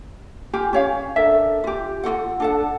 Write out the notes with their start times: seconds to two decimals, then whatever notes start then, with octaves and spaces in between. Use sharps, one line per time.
0.53 F4 G4 G#5
0.73 C#4 C#5 F5
1.16 D4 A4 A#4 E5
1.64 F4 G4
2.04 F4 F#4 A4 F#5
2.40 D4 A4 F#5